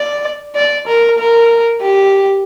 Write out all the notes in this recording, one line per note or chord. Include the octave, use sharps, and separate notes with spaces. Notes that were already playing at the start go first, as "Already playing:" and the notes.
Already playing: D5
D5
A#4
A#4
G4